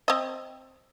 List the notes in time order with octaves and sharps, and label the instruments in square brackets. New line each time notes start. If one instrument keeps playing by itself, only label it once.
[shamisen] C4 D#5